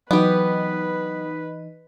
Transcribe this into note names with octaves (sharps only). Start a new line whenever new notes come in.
E3 F#3 B3 D#4 G4 B4 D#5